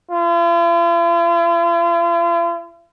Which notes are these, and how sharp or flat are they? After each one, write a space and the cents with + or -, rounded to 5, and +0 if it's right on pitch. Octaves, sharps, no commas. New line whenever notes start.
F4 -45